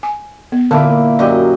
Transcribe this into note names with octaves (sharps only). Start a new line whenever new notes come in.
G#5
B3
A#2 D3 E4 A#4 A5 D6
F#2 G4 D5 D#5